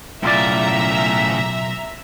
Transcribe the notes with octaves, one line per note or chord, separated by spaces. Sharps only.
B1 A2 C#3 F4 D5 E5 A#5